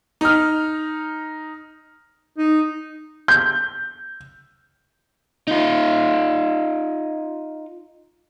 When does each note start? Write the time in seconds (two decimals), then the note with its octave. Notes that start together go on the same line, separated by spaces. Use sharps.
0.21 D#4 F6
2.38 D#4
3.28 G6
5.48 D#4 F4